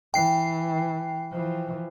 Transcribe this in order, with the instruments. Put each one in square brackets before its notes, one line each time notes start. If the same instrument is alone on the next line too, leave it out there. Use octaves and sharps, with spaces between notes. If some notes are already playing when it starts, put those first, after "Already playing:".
[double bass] E3 [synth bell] G5 C7
[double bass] E3 F3